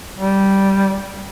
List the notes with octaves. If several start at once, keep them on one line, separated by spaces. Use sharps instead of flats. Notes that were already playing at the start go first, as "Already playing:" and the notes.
G3